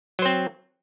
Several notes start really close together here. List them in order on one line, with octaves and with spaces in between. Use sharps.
F#3 C5 C4